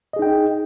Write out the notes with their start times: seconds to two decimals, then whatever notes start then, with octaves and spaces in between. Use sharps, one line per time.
0.13 D#5
0.16 G#4
0.19 D#4
0.22 G5